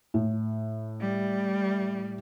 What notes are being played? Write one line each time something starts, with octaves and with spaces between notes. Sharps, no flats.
A2
G3